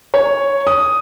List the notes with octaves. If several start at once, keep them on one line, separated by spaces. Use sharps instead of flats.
C#5
D#6